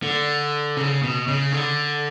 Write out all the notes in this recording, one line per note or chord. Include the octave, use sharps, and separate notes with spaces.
D3
C#3
B2
C#3
D3